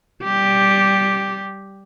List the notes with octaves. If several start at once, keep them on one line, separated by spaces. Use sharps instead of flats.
G3 G4